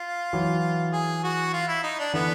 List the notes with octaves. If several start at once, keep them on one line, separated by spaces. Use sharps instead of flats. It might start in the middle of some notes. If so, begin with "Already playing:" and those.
Already playing: F4
E3 F#3
G#4
F#4
F4
E4
D#4
D4
D3 E3 B3